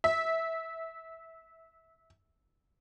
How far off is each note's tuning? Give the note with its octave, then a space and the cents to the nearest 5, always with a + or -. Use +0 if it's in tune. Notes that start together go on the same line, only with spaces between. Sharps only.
E5 -10